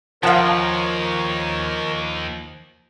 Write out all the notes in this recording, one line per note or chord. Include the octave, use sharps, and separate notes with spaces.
D#2 F3 A#4 C#5 F5 F#5 A5